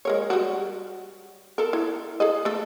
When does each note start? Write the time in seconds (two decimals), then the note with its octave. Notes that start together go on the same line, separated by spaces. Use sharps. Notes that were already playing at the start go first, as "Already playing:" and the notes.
0.05 G#3 A#4 C#5
0.30 G3 F#4
1.58 A4 A#4
1.73 E4
2.20 G#4 A4 D#5
2.45 A3 A4